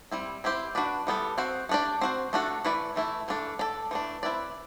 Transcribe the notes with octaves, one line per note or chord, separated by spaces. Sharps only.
G3 C4 E4
C4 E4 G4 C5
D4 F#4 B4 D5
E3 G3 B3 D4 A4
C4 F#4 C5
A3 D4 G4 D5
C4 F#4 C5
A3 D4 F#4 A4
E3 A3 E4 B4 D5
E3 A3 E4
E3 A3 D4 F#4 A4
D4 A4 D5
E3 A3 D4
C4 E4 B4 D5